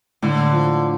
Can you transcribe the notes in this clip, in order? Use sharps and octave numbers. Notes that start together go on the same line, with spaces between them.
A2 D3
F3